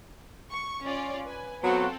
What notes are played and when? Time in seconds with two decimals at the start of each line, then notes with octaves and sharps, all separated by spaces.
0.51 C#6
0.84 C#4 F4 D5
1.26 B4 G#5
1.63 F#3 B3 C4 F4 F#4 A4